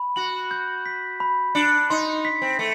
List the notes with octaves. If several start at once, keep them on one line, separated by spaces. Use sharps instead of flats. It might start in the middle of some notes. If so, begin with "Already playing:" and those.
Already playing: B5
F#4 F#7
G6
B6
B5
D4 C#7
D#4 C6
B6
C4
A3